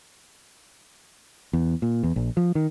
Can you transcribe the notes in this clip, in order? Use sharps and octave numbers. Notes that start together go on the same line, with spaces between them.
E2
A#2
E2
A#1
F3
D#3